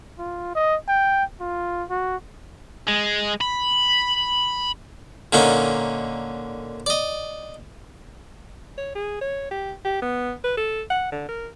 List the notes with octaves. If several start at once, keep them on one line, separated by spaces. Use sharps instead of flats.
F4
D#5
G5
F4
F#4
G#3
B5
A#2 D3 A#3 C#4 D#4
D5 D#5
C#5
G#4
C#5
G4
G4
B3
B4
A4
F#5
D3
A#4